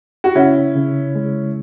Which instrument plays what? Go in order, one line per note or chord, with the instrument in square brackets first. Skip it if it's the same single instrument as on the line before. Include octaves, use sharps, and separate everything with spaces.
[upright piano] F#4
[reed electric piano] C#3 [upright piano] C#4 E4
[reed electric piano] C#3
G#3